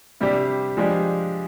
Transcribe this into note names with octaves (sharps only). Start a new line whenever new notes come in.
C3 G3 D4 G4
F3 G#3 D4 G4